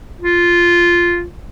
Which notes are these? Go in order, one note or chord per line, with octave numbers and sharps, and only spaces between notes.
F4